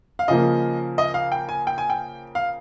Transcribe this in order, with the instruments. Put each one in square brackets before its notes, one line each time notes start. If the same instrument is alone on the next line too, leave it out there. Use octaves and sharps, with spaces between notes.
[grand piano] F5
[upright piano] C#3 F3 A#3 [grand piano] D#5
[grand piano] D#5
F5
G5
G#5
G5
G#5
G5
F5